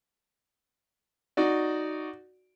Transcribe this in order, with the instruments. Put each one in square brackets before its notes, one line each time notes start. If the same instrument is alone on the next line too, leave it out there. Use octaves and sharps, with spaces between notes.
[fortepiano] D#4 F#4 D5